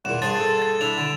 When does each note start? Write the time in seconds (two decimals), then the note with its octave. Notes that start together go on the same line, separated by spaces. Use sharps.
0.05 E2 A#2 F#5 E7
0.22 G2 G#4 C5 A5 A6
0.40 A4
0.62 A6
0.81 D4 E4 F7
0.97 D3